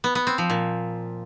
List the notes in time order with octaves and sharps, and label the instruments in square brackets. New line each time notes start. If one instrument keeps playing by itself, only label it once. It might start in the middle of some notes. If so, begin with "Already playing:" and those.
[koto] B3
B3
C4
F3
A#2